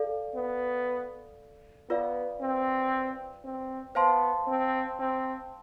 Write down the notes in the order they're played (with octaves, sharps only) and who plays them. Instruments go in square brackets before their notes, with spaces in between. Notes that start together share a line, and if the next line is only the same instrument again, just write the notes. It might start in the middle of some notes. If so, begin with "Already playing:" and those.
Already playing: [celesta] A4 D5 F5
[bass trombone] B3
[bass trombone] B3 [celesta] F4 B4 D5 F5
[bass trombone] C4
C4
[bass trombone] B3 [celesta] C5 F5 A5 C6
[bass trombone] C4
C4